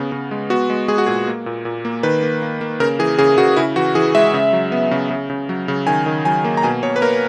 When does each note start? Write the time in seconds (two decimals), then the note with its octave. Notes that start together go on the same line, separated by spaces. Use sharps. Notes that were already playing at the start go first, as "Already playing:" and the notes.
Already playing: C#3 B3
0.12 C#3
0.31 G#3
0.50 B3 F#4
0.70 G#3
0.88 G#3 G#4
0.98 F#4
1.06 A#2 G#4
1.27 A#3
1.46 A#2
1.65 A#2
1.85 A#3
2.03 D#3 B4
2.23 A#3
2.42 A#3
2.61 A#3
2.80 C#3 A#4
2.99 E3 G#4
3.18 C#3 G#4
3.38 C#3 F#4
3.57 C#3 E4
3.76 E3 F#4
3.95 E3 G#4
4.15 G#3 E5
4.34 C#3
4.53 F#3
4.72 B3
4.91 C#3
5.10 C#3
5.30 C#3
5.49 F#3
5.68 C#3
5.87 D#3 G#5
6.06 D#3
6.25 F#3 G#5
6.44 A#3
6.57 A#5
6.63 B2 G#5
6.83 B2 C#5
6.96 B4
7.02 A#3 A#4